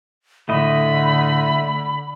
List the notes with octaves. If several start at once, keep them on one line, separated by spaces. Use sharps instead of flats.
A2 D3 A3 D#5 B5